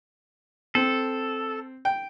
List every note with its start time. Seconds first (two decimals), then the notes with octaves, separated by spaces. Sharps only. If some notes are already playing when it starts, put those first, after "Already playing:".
0.75 C4 A4
1.85 G5